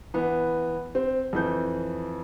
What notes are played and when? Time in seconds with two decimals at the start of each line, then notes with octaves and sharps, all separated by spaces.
0.14 E3 B3
0.95 C4
1.33 F2 E3 G6